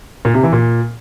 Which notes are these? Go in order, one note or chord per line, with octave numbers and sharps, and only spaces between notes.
A#2
C3
E3
A#2